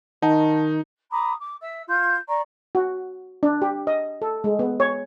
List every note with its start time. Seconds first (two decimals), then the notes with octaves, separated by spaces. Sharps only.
0.22 D#3 D#4 F#5 A5 A#5
1.11 A#5 B5 D6 D#6
1.39 D6
1.61 E5 E6
1.87 F4 C6 G6
2.27 D5 A#5 C#6
2.75 F#4
3.43 D4
3.62 G4
3.87 D#5
4.22 A4
4.44 G#3
4.59 B3
4.80 C#5